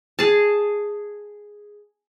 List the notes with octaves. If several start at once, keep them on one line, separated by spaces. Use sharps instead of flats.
G#4 A5